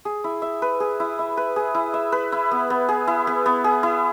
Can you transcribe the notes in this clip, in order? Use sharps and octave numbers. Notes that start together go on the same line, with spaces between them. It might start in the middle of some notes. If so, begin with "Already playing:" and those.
G#4
E4
E5
B4
G#4
E4
E5
B4
G#4
E4
E5
B4
E4
B3
B3
G#4
E4
B3
B3
G#4
E4